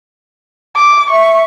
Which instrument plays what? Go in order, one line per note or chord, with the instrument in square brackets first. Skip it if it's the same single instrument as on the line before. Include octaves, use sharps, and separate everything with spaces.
[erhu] D6
[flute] E5 [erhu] C#6